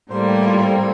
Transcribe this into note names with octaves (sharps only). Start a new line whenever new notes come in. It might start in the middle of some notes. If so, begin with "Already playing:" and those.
A2 G3 A#3 C5
G4
E4
F4
C4